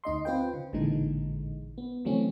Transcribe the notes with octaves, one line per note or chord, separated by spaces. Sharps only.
D2 D#4 D#5 C6
C4 F4 B4 C5 G5
C#3
A1 A#2 D3 E3 G#3 D#4
B3
C#3 E3 F#3 A3 C4 C#4